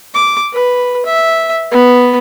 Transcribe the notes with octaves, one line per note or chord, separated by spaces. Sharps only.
D6
B4
E5
B3